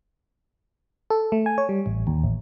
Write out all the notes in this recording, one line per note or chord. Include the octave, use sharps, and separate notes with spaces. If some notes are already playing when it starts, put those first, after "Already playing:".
A4
A3
G#5
C#5
G3
A1
D#2
A1